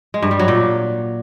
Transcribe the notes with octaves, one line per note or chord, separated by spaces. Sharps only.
G#3
G2
G3
F#3
A#2